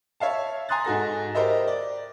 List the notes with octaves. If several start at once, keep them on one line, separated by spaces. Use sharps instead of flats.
C#5 E5 F5 A5
G#5 A#5 C6 D#6 F#6 A6
G#2 F#4 A4 A#6
G4 A#4 C5 D#5 E5
D5